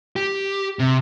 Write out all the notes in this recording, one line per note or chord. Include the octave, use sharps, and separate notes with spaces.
G4
C3